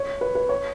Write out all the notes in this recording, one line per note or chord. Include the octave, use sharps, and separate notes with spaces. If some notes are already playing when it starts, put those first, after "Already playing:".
Already playing: C#5
B4
B4
C#5